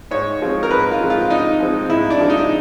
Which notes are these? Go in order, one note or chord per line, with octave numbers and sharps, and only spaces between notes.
G#2 C#5
F3 G#3 C4
A#4
G#2 B4
F4
F3 G#3 C4
F4
G#2 D#4
F3 G#3 C4
G#2 E4
D4
F3 G#3 C4
D#4